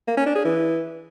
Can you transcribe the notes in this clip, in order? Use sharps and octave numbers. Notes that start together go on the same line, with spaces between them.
A#3
C#4
D4
G#4
E3